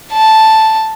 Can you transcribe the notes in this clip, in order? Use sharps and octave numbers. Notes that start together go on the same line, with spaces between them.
A5